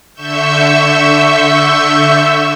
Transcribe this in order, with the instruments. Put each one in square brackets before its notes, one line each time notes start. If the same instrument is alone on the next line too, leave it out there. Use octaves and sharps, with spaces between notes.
[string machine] D3 E5 C#6 E6 G6